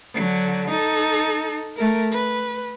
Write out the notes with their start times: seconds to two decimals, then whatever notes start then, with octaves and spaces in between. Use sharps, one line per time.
0.14 D3 F#3
0.69 D#4 A4
1.77 A3 A#4
2.12 B4